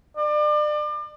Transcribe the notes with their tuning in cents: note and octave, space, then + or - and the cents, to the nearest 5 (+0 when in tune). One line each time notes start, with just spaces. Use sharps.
D5 +35